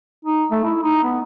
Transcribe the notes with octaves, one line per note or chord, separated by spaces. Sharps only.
D#4
A3
E4
D#4
B3